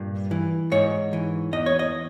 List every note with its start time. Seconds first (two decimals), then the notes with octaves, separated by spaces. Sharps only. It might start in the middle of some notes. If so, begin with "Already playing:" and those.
Already playing: G2 A#2
0.31 E3
0.72 G#2 C#5
1.13 E3
1.53 E2 D#5
1.66 C#5
1.79 D#5